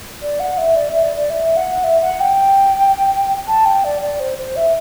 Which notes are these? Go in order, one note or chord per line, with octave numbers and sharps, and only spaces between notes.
D5
F#5
E5
D5
E5
D5
D5
E5
F#5
E5
F#5
G5
A5
G5
D5
D5
C5
C5
E5